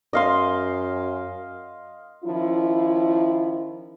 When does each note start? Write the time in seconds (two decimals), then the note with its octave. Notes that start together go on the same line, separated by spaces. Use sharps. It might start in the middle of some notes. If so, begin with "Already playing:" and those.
0.13 F#2 D#5 F5 C6
2.25 D#3 F3 C#4 E4